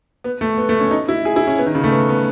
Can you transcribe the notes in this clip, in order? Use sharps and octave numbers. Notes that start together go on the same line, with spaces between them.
B3
A3
B3
A3
C#4
D#4
E4
G#4
E4
C#4
B3
D#3
C#3
A3
B3
B3